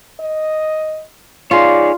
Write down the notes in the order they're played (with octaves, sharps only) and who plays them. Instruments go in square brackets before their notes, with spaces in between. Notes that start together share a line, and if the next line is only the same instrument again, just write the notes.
[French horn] D#5
[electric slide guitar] D#4 G#4 C#5 [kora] F4 [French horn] D5